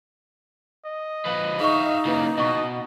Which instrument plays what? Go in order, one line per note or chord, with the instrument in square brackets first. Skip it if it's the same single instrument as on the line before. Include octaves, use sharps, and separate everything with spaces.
[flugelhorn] D#5
[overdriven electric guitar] F3 B4
[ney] D#4 [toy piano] G#4 C#6 [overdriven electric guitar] E5 F5
[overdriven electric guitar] C#3 A#3 [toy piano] E4 B4 F5
[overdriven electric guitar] B2 [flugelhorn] D#5 [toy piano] A#5 C#6